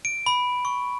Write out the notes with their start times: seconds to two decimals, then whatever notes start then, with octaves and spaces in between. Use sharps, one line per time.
0.05 D7
0.26 B5
0.65 C#6